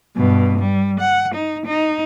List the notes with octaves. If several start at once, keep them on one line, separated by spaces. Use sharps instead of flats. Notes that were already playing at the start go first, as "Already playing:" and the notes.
G2 B2
G3
F#5
D#4
D#4